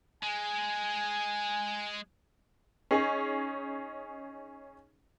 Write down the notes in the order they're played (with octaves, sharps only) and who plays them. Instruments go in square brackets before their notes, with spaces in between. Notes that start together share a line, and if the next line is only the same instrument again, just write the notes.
[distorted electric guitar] G#3 [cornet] G#5
[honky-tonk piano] C#4 D#4 G#4